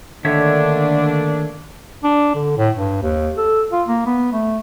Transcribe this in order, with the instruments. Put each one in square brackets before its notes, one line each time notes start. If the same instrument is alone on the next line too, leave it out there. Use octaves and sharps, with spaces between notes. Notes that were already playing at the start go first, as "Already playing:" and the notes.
[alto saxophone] D3 [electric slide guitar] D#3 C#5 E5 [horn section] A3 A#3 D4
[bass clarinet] D4
D3
A2
G2
D#2
A4
F4
A#3
B3
A3